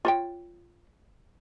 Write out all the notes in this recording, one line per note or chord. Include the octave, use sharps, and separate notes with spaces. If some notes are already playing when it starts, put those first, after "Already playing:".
F4 C#5 G5